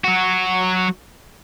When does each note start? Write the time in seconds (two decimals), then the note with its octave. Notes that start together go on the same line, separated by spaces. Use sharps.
0.04 F#3 F#4